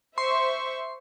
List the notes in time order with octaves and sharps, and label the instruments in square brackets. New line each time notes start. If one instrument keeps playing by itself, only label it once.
[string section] C5 E5 C#6 [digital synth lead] C6